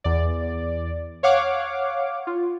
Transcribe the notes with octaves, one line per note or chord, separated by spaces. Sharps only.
E2 D5
C#5 F5 F#5 D6
F4